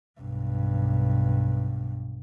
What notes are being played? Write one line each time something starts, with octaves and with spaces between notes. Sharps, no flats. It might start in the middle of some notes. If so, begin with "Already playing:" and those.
B1 G2